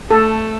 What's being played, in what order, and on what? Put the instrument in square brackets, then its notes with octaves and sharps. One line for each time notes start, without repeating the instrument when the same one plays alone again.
[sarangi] A3 [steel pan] A4